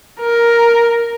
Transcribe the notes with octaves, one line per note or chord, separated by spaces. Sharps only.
A#4